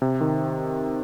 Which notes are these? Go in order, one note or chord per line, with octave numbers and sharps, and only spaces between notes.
C3
D#3